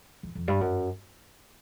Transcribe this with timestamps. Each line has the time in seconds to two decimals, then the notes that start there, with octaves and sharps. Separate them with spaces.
0.23 F2
0.35 F2
0.48 G2
0.61 F#2